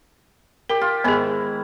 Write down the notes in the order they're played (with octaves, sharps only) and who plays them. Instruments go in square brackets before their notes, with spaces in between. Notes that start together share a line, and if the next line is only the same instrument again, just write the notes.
[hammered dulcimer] G4 [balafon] A#4
[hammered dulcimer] F4
[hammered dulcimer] G#2 D#3 E4 [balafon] B3 G#4